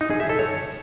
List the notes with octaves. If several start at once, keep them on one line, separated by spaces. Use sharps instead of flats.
D#4
G#4
E5
A4
C#5